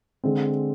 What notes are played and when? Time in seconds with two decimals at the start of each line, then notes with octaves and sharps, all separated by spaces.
0.24 D3 G#3 C4